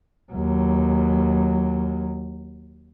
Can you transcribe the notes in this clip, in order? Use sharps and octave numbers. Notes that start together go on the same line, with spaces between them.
D#2 F#3